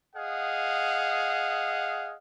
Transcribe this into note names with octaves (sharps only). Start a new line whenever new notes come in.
G#4 D#5 F5 F#5